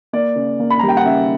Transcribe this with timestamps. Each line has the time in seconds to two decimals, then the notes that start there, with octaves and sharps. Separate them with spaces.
0.13 A#3 D5
0.36 C#3
0.60 A#3
0.70 B5
0.79 G3 A#5
0.88 G5
0.97 F#5
1.05 C#3 E5